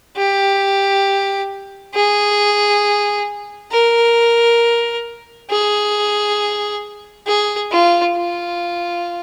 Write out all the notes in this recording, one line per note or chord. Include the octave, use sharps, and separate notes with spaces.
G4
G#4
A#4
G#4
G#4
F4
F4